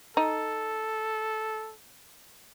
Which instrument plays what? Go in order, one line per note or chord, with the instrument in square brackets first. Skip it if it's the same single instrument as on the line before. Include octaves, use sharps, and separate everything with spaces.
[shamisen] D#4 [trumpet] A4